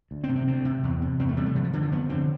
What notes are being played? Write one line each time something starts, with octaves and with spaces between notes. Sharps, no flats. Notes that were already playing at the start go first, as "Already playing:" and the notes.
D2
C4
C3
C4
D2 C4
C3
E2
C3
E2 C4
A3
C3 G3
A3
F2 G3
F3
D3 E3
F3
F2 B3
D3 C4